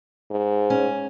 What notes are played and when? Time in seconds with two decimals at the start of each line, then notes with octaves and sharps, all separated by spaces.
0.31 G#2
0.70 C#4